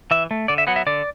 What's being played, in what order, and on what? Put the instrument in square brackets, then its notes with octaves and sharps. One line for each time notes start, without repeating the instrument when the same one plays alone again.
[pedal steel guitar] E3 E5
A3
D3 D5
E5
F#3 B3 F#5
E5
D3 D5